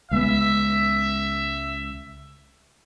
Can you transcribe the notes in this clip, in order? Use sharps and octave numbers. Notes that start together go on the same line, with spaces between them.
C#2 G#3 B3 E5